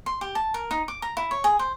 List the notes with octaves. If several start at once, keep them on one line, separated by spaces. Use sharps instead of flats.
C6
G4
A5
A#4
D#4
D6
A#5
E4
C#5
G#4
C5